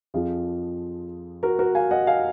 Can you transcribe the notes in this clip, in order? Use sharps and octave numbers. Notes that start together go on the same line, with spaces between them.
F2 F3 F4 G#4
F#4 A#4
F#4 A#4
F5 G#5
D#5 F#5
F5 G#5